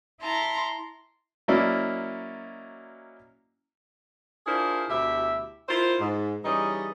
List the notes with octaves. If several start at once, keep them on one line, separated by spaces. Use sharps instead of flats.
E4 A5 A#5 C6
F#3 A#3 C#4 E4 D5 D#5
D4 E4 F4 G#4 A#4 C5
D2 B2 E4 G4 E5
E4 F4 A#4 C5
G#2
E3 G3 C#4 D#4 G#4 D#5